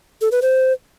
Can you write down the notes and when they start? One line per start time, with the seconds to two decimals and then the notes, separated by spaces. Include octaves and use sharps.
0.21 A4
0.32 B4
0.42 C5